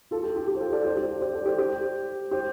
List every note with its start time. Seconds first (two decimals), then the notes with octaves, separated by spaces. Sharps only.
0.11 F4 A4
0.23 G4
0.36 G4
0.48 G4
0.55 C5
0.60 F4 A4
0.72 A4 D5
0.84 G4 C5
0.97 G4 C5
1.21 G4 C5
1.33 A4 D5
1.46 G4 C5
1.58 G4 C5
2.31 G4 C5